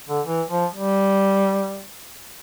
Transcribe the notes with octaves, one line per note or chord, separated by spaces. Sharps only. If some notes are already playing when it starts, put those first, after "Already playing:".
D3
E3
F3
G3